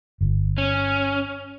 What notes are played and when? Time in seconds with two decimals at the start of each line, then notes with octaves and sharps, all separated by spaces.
0.21 G1
0.58 C#4